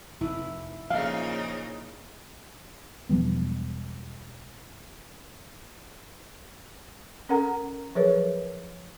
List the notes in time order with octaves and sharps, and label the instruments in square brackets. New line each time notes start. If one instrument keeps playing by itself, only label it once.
[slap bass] F1 [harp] E4
[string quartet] A#2 C#3 D#4 [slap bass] F3 [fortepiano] F5
[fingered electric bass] E1 F3 G3 B3
[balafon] C#4 A4 A#4 F#5 A#5
F3 F#3 G#4 A#4 B4 C#5